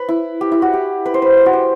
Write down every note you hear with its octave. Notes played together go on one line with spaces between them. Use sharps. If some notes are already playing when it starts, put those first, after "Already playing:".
Already playing: B4
E4
G4
E4
F#4
G4
B4
C5
B4
C5
F#4
G4